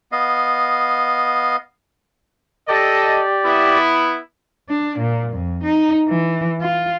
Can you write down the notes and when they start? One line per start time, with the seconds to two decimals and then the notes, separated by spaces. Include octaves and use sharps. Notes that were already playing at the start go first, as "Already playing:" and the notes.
0.12 B3 D#5 F5
2.69 G4 A4 D5 D#5
3.45 B3 E4
4.70 D4
4.99 A#2
5.33 F2
5.64 D#4
6.09 E3
6.62 F4